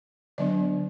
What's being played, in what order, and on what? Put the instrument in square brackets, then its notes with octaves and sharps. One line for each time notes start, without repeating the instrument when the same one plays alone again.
[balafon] D3 F#3 B3 D4 D5